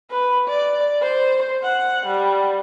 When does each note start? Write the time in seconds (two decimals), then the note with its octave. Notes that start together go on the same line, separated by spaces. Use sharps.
0.11 B4
0.48 D5
1.02 C5
1.63 F#5
2.06 G3